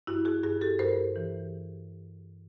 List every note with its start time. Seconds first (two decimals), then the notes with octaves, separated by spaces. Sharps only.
0.07 G2 E4 F#4
0.25 F#4 G#4
0.43 G2 F#4 G#4
0.61 G4 A4
0.79 G2 A#4 C5
1.16 E3